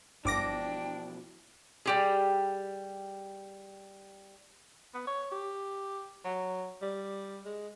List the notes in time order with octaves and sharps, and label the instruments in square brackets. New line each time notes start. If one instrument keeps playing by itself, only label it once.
[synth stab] G1 D6 A#6 [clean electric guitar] B2 E3 F3 [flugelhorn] D4 [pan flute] G5
[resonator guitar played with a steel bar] G3 G4 G#4
[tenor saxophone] B3
C#5
G4
F#3
G3
G#3